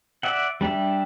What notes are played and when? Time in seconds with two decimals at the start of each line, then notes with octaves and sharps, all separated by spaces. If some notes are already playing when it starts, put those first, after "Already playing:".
0.23 D5 E5 F#5
0.61 G3 D4 G4 E5